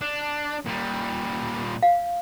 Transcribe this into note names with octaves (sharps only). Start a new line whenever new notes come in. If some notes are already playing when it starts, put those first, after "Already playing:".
D4
A#2 G3
F5